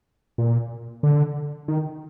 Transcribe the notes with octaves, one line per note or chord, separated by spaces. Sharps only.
A#2
D3
D#3